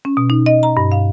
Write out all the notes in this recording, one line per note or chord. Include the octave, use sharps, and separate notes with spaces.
C#4
B2
D#4
D#5
A#5
G2
F5